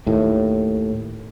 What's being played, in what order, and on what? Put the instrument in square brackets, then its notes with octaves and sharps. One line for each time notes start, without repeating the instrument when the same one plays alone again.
[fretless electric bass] D#2 A2